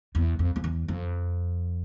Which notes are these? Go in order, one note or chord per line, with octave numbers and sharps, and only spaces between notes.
E2
F2
F2
E2
F2